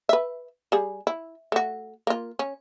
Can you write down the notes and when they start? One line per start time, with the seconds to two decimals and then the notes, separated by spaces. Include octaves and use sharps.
0.09 B4 E5
0.72 G3 G#4
1.07 E4
1.52 A3 F#4
2.07 A#3 F4
2.39 C#4